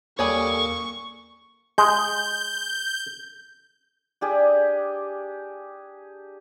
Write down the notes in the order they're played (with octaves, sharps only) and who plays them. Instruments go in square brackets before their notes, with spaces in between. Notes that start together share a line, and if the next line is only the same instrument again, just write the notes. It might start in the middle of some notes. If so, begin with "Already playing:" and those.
[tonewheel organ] E2 A4 G#5 [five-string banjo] G3 G#4 C#5 [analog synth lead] A#3 [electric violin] C#6
[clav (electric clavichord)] G#3 [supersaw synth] G6
[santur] D4 G4 G#4